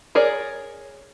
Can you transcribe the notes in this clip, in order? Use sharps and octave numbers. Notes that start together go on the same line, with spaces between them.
G#4 A#4 C#5 D5